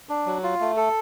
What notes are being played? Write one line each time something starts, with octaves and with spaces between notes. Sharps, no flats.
D4
F#3
F4
A3
A4